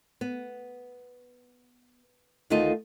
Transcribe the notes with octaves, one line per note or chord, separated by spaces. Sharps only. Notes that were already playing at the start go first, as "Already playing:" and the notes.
B3
D2 D#3 A3 D#4 F4 D#5